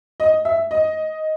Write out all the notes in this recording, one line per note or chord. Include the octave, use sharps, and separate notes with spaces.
D#5
E5
D#5